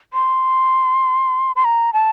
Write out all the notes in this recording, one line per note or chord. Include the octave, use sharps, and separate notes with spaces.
C6
C6
A#5
A5